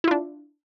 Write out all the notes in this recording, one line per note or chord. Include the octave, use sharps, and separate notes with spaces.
D4 E4 F4